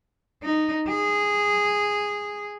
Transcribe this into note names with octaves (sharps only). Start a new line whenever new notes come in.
D#4
G#4